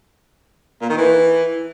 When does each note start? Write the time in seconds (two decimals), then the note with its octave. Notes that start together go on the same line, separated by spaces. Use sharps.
0.82 A#2
0.90 D#3
0.98 E3